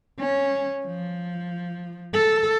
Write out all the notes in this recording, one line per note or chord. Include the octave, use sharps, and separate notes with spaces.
C#4
F3
A4